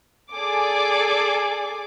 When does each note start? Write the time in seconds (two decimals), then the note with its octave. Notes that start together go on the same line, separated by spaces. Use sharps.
0.33 G#4 A4 D5 G#5 D6